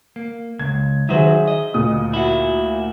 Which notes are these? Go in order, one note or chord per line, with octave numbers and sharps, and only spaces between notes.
A#3
C#2 G#6
D#3 F#3 F#4 G#4 C5 E5
D#5
D2 A#2 D#6
E4 F#4